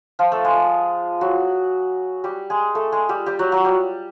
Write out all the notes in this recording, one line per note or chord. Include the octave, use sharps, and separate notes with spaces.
F3 F4
A3 A4
G#3 G#4
F#3 F#4
G3 G4
G#3 G#4
A3 A4
G#3 G#4
G3 G4
G3 G4
F#3 F#4
F#3 F#4
G3 G4